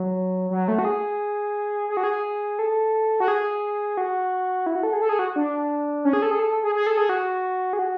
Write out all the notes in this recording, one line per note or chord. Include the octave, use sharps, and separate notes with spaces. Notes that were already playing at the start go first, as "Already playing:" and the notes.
Already playing: F#3
F#3
A3
F#4
G#4
G#4
F#4
G#4
A4
F#4
G#4
F#4
E4
F#4
A4
G#4
A4
G#4
F#4
D4
C#4
G#4
A4
G#4
A4
G#4
G#4
A4
G#4
F#4
G#4
F#4